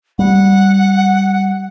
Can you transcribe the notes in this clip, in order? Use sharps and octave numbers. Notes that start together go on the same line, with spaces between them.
G3 F#5